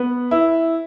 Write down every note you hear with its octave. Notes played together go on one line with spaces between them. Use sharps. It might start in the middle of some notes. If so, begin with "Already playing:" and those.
Already playing: B3
E4